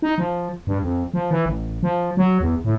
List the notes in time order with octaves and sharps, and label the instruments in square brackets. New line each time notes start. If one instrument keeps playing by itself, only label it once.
[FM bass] D#4
F3
G2
F2
F3
E3
A1
F3
F#3
E2
A2